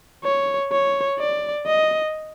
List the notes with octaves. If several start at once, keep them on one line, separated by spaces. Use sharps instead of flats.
C#5
C#5
D5
D#5